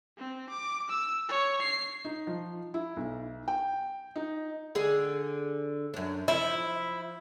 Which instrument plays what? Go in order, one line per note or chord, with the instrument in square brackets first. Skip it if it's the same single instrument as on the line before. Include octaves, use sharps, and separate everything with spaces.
[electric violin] C4
D6
E6
C#5
C7
[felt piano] D#4
F3
E4
B1
G5
D#4
[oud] D3 G#4
F#2 D4
[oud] F3 [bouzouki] E4